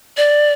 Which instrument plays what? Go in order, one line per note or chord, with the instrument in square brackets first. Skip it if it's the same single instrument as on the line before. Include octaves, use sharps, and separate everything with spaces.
[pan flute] D5